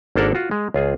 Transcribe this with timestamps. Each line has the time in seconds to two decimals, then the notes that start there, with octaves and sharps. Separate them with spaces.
0.16 G#1 A#3 D4 A4 A#4 F#5
0.35 F4 F#4
0.51 G#3
0.74 C#2 F4 G#4